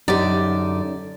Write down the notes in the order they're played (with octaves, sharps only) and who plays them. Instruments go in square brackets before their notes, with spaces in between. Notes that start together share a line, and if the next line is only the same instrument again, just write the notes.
[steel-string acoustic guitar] F#2 D3 [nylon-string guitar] D#4 G4 [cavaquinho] D5